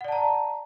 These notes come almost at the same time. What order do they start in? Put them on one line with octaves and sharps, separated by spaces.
F#5 D5 A5 A#5